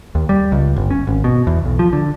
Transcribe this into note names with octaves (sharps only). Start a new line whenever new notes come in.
D#2
G3
C#2
G1
C#4
G#1
B2
E2
B1
F3
D3